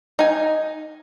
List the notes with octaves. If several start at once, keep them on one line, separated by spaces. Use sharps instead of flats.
D#4 G#5